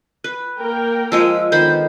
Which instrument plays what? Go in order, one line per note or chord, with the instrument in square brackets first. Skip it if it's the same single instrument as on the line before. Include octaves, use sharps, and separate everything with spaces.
[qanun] B4
[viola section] A#3 A#4 G5
[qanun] F3 G#3 G#4 [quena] E6
[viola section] D3 F3 B3 [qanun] D#3 C5 B5 [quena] G6